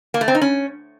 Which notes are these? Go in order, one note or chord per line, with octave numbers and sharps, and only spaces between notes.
A#3
A3
C4
D#4
C#4